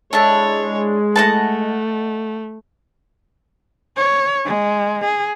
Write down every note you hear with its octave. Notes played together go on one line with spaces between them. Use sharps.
G#3 D4 E4 A4 C#5 E5 A5
A3 E4 A4 B4 D#5 F#5 A5
C#5
G#3
G#4